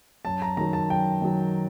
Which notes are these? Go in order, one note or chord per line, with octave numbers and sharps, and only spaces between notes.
F#2 A5
A#5
D#3 F#3 A#5
A5
F#2 G5
D#3 F#3